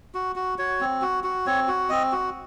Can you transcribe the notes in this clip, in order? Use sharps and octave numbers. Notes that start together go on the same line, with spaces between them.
F#4
F#4
F#4 C#5
C4
F#4
F#4
C4 C#5
F#4
C4 D#5
F#4